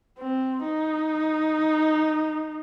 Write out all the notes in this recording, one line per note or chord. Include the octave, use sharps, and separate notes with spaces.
C4
D#4